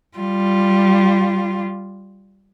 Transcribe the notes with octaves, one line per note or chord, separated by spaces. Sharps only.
G3 F4